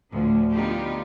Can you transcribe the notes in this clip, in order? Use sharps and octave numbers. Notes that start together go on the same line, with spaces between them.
D2 A2 F3
D3 B3 D#4 F4 G4